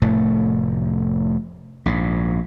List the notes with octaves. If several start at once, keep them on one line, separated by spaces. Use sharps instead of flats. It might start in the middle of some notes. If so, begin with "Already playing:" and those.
F1 A2 A3
A#1 G#2